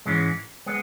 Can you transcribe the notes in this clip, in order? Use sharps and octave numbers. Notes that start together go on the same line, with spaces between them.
G#2 E3 G#3 C#4
G#3 B3